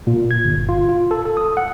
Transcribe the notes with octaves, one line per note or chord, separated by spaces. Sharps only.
A#2
G#6
G1
F4
F4
A4
A4
D#6
F#5